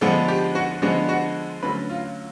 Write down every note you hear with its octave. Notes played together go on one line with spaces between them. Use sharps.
D3 F3 G#3 B3 D4 A4
G4
F#4
D3 F3 G#3 B3 D4 F#4
F#4
D3 F#3 A3 C#4 B4
F4